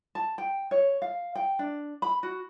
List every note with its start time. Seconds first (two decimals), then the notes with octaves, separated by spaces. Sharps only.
0.15 A5
0.38 G5
0.71 C#5
1.02 F5
1.35 G5
1.59 D4
2.02 B5
2.23 F#4